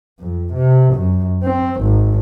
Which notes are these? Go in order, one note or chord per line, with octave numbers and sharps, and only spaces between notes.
F2
C3
F#2
C4
G#1